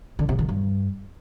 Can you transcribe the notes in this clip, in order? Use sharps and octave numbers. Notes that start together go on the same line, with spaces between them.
D3
C3
D#3
G2